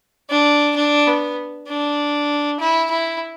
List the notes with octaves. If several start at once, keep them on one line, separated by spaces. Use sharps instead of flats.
D4
D4
B3
D4
E4
E4